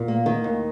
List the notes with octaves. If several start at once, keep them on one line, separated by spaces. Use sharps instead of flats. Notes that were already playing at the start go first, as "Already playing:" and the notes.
Already playing: A#2
A#3
D#3
D#2